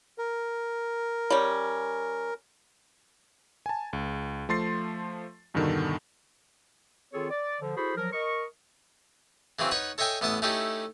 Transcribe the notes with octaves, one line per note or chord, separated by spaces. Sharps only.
A#4
G3 C#4
G#5 A5
C#2
F3 A3 C6 A6 C7
E2 G2 B2 D3 D#3
D#3 C4 F4 G#4 A4 C#5
D5
D3 F3
E4 F#4 G#4 A4 C5 B5
F3 F#3 A#4
A#4 D#5 C#6
C#3 E3 F#3 C4
D#4 B4 C#5 F#5
A4 C#5 D#5 E5 G5 G#5
A1 B3 E4 A5 D#6
A3 C#4 D#4 E4 G4 A4